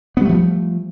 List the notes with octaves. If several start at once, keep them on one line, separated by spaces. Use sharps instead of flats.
F3 G3 A3 B3